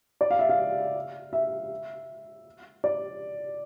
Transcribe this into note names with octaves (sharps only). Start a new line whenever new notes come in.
D5
F5
E5
F5
E5
D5